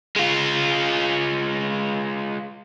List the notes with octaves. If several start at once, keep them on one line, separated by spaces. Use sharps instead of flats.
G#3 F4